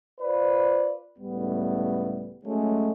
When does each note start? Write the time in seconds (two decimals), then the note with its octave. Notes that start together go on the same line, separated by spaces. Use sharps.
0.20 F4 B4 C5 D5
1.18 C#2 A2 G3 B3
2.45 F#3 G#3 A3 C#4